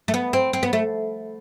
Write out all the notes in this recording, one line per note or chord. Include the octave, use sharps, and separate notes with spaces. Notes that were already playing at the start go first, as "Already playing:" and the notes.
A3
B3
C4
C4
B3
A3